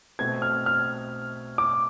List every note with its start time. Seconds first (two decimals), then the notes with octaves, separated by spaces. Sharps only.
0.19 B2 A3 C4 G#6
0.42 F6
0.66 F6
1.58 D6